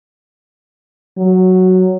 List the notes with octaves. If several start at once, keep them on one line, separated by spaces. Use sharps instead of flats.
F#3